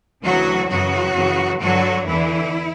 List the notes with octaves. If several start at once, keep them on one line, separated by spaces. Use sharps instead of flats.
D2 C#3 E3 F#3 F#4
F#2 C#3 E3 F#3 F#4
F#2 C#3 E3
G2 D3 F#3 F#4
E2 D3 E3 E4